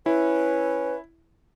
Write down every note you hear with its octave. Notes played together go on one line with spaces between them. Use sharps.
C#4 E4 B4